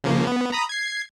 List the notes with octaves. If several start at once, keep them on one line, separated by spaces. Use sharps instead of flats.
C#3 F3 A#3
B3
A#5 B5 D#6
G#6 C7